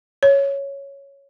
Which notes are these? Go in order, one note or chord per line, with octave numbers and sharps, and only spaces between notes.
C#5